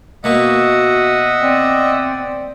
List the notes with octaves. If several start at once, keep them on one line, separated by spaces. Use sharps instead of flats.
B2 A#3 F#4 D#5 E5 F#5 C#6
C4 D5